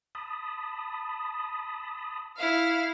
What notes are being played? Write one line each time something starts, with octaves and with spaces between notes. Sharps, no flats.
A5 B5 D#6
E4 F5